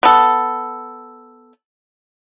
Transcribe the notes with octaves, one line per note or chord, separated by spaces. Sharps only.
B3 A4